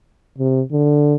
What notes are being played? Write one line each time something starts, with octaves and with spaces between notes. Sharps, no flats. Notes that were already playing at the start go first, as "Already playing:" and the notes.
C3
D3